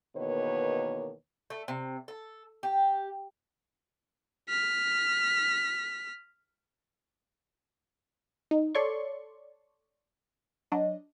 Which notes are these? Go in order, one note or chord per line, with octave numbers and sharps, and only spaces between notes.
E2 B2 D#3 A#3 B4 C#5
A3
C3
A4
G4
F6 B6
D#4
A4 C#5 D5 C6 C#6
F#3 D4 D#5